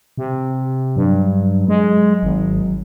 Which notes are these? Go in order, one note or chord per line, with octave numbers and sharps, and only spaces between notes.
C3
G2 F#3
G#3
G#1